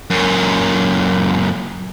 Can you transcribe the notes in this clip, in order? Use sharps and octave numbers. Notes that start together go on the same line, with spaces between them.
F#2 A#2